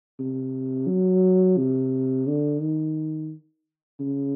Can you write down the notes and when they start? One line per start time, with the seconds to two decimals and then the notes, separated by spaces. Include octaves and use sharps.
0.19 C3
0.88 F#3
1.57 C3
2.27 D3
2.61 D#3
4.00 C#3